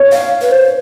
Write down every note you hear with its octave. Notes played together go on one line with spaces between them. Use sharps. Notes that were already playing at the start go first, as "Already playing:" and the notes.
Already playing: C#5
F5
B4
C5